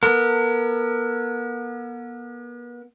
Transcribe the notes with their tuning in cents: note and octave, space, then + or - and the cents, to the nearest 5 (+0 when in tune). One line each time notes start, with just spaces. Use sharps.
B3 -40 A#4 -40